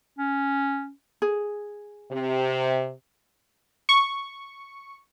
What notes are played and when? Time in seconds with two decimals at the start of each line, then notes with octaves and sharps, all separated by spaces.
0.18 C#4
1.22 G#4
2.12 C3
3.89 C#6